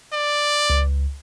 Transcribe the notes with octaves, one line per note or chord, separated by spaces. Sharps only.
D5
C#2